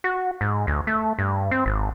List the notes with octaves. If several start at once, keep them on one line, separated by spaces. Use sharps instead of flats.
F#4
G#2
D2
A3
G2
C4
G#1